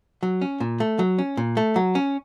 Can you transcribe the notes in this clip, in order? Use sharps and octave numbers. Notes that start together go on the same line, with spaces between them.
F#3
C#4
A#2
A3
F#3
C#4
A#2
A3
F#3
C#4